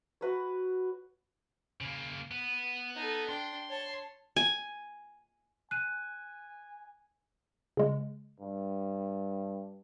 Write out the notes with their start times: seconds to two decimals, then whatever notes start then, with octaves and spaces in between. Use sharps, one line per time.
0.21 F#4 B4 C#5
1.81 C#3 A#3
2.31 B3
2.95 D#4 A4
3.29 D4 G5 C6
3.70 C#5 A5
4.36 G#5
5.71 G#5 F#6 D#7
7.77 C#3 G#3
8.40 G2